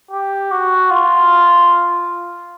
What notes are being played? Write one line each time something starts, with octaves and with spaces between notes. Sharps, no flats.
G4
F#4
F4